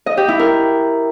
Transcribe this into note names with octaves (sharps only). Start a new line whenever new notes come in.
D#5
G4
E4
A#4